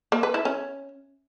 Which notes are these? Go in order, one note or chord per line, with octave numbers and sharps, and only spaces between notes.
A#3
B4
E4
C#4